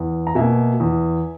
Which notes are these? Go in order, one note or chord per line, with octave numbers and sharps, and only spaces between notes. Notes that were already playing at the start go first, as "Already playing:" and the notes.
Already playing: E2
A#5
B2 A#3 E5 G#5
E2